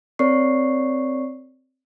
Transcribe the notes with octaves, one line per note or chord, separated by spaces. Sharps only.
C4 A#4 C#5 D5 C#6 C7